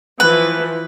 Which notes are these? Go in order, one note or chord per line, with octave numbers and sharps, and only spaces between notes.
E3 F3 B4